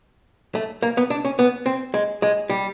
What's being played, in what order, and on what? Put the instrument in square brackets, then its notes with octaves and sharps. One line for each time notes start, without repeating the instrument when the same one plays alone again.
[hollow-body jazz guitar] A3
A#3
B3
D4
C#4
B3
C4
G#3
G#3
G3